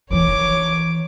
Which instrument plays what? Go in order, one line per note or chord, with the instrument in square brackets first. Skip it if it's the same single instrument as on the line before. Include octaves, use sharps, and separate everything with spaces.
[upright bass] D#3 E3 [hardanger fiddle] C#5 D6